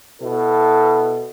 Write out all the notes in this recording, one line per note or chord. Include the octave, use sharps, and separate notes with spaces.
B2 E4 A4